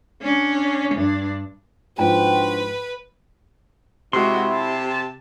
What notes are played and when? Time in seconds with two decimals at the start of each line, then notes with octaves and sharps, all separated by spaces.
0.22 C#4 D4
0.95 G2 D4
1.98 G#2 F3 D4 F#4 B4 C5 G5
4.13 C3 G#3 E4 F#4 C6
4.54 A5